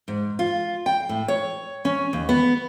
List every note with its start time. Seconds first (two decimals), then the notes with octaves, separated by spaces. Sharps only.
0.08 G#2
0.39 F4
0.86 G5
1.09 A2
1.28 C#5
1.85 C#4
2.13 D#2
2.29 B3